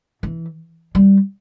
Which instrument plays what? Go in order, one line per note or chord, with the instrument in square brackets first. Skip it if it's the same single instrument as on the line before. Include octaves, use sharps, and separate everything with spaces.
[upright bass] E3
G3